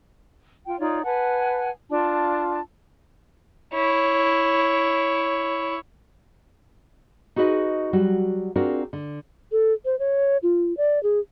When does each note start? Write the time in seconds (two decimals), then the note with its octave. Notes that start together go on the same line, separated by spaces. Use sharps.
0.67 F4 G5
0.80 D#4 F4 C#5 D5
1.05 B4 F#5 G#5 A5
1.90 D4 F4 A5
3.74 E4 C#5
7.36 D#4 F#4 G#4 B4 D#5
7.93 F#3 G3 F#4
8.56 C4 D4 F4 F#4 G#4 A#4
8.93 D3
9.52 A4
9.85 C5
9.99 C#5
10.43 F4
10.77 D5
11.03 G#4